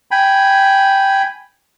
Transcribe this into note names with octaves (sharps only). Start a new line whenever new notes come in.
G5 G#5 B5